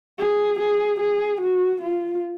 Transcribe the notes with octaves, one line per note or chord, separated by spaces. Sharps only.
G#4
G#4
G#4
F#4
F4